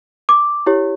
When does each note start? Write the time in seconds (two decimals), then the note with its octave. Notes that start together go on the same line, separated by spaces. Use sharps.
0.29 D6
0.66 E4 G4 C#5